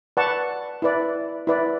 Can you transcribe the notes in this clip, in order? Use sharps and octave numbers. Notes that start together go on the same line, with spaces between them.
B4 D5 F#5 A5 C#6
E4 B4 D5
E4 B4 D5